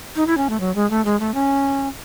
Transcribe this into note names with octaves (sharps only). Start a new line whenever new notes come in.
D#4
E4
C#4
A3
F#3
G#3
A3
G#3
A3
C#4